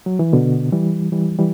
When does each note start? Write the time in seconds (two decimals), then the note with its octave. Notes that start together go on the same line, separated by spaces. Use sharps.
0.06 F#3
0.19 E3
0.33 B2 D3
0.72 E3 G3
1.12 E3 G3
1.39 E3 G3